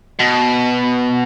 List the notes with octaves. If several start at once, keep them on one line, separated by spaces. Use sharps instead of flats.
B2